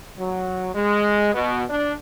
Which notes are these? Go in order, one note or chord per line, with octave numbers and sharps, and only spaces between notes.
F#3
G#3
B2
D4